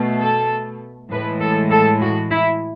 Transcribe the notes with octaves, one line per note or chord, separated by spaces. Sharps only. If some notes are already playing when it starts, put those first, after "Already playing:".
Already playing: B2 A3
A4
A2 E3 G#3 B4
A4
A4
F#4
E4